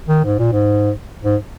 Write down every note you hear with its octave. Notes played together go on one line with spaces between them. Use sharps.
D#3
G#2
A#2
G#2
G#2